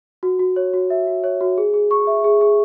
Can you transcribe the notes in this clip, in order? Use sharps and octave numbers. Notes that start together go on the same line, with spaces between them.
F#4
F#4
C#5
F#4
E5
F#4
C#5
F#4
G#4
G#4
C#6
E5
G#4
G#4